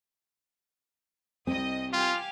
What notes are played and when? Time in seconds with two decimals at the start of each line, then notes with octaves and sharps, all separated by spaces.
1.47 C2 C4 D#5 D#6
1.93 F4 G4 F5 G#5